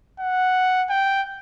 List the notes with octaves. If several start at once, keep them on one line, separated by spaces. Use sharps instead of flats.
F#5
G5